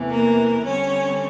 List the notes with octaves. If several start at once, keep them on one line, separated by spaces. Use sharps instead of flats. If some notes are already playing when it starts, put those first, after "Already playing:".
Already playing: E2 C3 E3 A3
A#3 A#4
D3 G3 C4 C#4 C#5